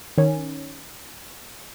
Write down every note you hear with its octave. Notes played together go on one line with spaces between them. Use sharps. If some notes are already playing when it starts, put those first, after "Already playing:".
D#3 C#4